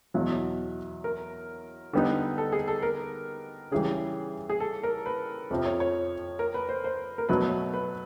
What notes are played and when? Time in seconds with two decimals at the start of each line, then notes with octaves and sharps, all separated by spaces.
0.14 E2 B2 F#3
1.04 A#4
1.93 D3 G3 B3 D#4
2.38 A4
2.52 G#4
2.68 A4
2.82 A#4
3.71 C#3 E3 G3 G#4
4.49 G#4
4.60 A4
4.84 A#4
5.06 B4
5.50 F2 C3 F3
5.65 C#5
5.80 C#5
6.39 A#4
6.54 B4
6.69 C5
6.84 C5
7.18 A#4
7.29 B2 F#3 A3 B4
7.74 B4